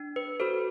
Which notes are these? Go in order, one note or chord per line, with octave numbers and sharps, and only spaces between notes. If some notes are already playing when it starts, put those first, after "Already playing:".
Already playing: D4
B4
F#4 A4 C5